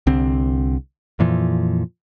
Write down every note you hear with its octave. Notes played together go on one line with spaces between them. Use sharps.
C2 D3 C4
F2 A#2 E3 F3